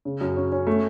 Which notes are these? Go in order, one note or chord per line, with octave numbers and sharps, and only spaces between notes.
C#3
F#2
C#4
C#4
A3